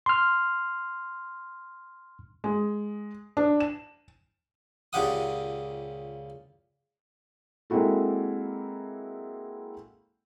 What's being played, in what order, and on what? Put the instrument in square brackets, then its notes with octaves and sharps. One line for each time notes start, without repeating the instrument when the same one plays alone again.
[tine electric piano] C6 F6
[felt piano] G#3
D4
E7
[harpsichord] C#2 A#2 C#3 G4 F#5 D#6
[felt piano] G#3 A#3 C4 E4 F#4 A4